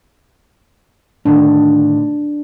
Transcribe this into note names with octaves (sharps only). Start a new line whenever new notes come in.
A2 D3 D#3 D4